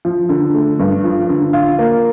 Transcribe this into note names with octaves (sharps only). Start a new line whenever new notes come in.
F3
D3
A3
G2
F3
D3
F4
A#3